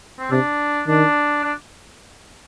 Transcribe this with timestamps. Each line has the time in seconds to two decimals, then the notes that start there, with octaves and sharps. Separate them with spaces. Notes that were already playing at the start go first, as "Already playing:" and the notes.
0.19 C4
0.31 C3 D4
0.87 D#3 D4
1.44 D4